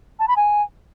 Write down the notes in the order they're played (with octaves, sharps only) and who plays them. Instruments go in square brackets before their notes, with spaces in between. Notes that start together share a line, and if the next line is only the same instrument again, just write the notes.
[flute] A5
B5
G#5